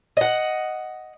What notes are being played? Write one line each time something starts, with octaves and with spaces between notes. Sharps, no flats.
D#5 F#5